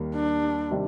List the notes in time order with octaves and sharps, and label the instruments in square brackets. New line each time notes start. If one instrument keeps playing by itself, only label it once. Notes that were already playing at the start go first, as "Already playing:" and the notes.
Already playing: [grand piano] D#2 D#3 G3 A#3
[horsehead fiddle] D4
[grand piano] C3 D#3 G3 D4